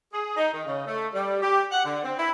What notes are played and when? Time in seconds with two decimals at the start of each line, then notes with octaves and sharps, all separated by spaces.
0.13 G#4
0.36 D#4
0.52 D#3
0.65 C#3
0.86 A3
1.14 G3
1.42 G4
1.72 F#5
1.85 D3
2.03 C4
2.18 E4